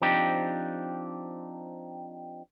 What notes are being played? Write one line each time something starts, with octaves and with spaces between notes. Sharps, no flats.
F3 C4 D4 D#4 G4